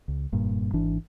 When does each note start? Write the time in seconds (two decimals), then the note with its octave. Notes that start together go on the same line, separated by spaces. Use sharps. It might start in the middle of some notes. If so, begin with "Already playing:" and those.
0.08 C#2
0.32 F1 G2 A#2
0.73 G#1 E3 D4